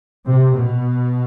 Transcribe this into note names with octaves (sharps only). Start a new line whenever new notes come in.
C3
B2